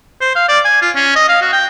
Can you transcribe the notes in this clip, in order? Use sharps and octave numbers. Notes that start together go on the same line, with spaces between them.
C5
F5
D5
G#5
F4
C#4
D#5
F5
F#4
G5